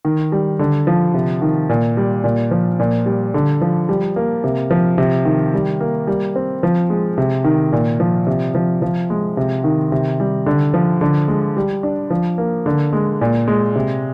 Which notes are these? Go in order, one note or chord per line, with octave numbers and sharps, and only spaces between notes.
D#3
G3
D3
F3
C3
D#3
A#2
G3
A#2
F3
A#2
G3
D3
F3
G3
A#3
C3
F3
C3
D#3
G3
A#3
G3
C4
F3
G#3
C3
D#3
A#2
F3
C3
F3
F3
G#3
C3
D#3
C3
G3
D3
F3
D3
G#3
G3
D4
F3
A#3
D3
G#3
A#2
G#3
C3